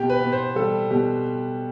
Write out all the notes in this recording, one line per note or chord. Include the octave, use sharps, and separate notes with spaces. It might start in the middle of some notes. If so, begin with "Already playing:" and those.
Already playing: B2 G4
B4
B3
C5
G3 A4
B2 G4